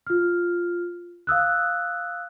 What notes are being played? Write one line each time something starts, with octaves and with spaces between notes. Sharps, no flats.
F4 F6
F5 D#6 E6 F#6